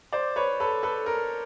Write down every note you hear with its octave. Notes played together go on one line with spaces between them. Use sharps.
C5 D5
B4 C#5
A4 B4
A4 B4
A#4